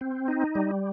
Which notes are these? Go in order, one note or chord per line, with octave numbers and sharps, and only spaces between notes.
C4
D#4
G3